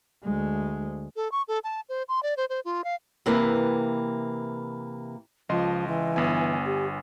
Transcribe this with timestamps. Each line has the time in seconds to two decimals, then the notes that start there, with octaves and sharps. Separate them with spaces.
0.24 D2 G#3
1.16 A4
1.32 C#6
1.48 A4
1.64 A5
1.89 C5
2.09 C6
2.23 D5
2.37 C5
2.50 C5
2.65 F4
2.84 F5
3.26 C3 E3 A#3 E4 B4
5.49 C#2 F3 D#5 C6
5.87 E3
6.16 G1 B3 G#5
6.66 G4